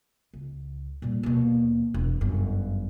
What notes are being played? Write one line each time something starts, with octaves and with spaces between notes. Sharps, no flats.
C#2
A#2 G3
D#2 B2
E1
G1 F#2